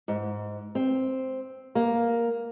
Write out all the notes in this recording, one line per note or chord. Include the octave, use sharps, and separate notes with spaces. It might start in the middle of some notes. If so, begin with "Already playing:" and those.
G#2
C4
A#3